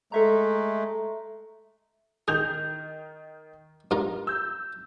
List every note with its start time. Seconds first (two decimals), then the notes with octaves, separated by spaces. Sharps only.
0.12 G#3 A3 A4 E5 A#5
2.28 D#3 G#4 G6 F7
3.91 G2 F4 A#4
4.27 E6 G6